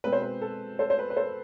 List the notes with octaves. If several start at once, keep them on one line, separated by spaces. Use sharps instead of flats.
B2 G#3 C4 B4
C5
B4
A4
A4 C5
C5
B4
B4
A4 C5